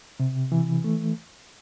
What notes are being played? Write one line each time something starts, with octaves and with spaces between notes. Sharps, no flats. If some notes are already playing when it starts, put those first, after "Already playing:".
C3
E3
A3